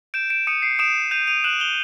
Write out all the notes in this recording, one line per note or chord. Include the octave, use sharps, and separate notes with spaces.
G6 D7 E7
D7 E7
D#6 C#7 D#7
C7 D7
D#6 D7 E7
G6 D#7 F7
D#7 F7
F#6 E7 F#7
F7 G7